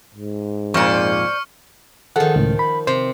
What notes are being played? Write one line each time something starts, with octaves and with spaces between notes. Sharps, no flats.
G#2
F2 A#2 C5 D5 C#6 F6 C#7
D#3 F3 G#4 A4 F#5
C#2 A2
B5
C3 C5